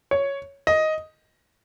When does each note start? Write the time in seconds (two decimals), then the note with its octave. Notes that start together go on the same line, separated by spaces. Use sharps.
0.11 C#5
0.67 D#5